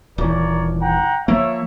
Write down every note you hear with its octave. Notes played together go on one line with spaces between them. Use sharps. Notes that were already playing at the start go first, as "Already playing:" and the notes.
D#1 E3 A#4 C#5 D5
F#5 G5 A#5
F3 A#3 C#5 E5